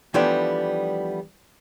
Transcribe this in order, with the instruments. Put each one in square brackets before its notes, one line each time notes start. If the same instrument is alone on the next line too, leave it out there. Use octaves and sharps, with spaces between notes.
[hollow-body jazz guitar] E3 F3 G3 A3 B3 D4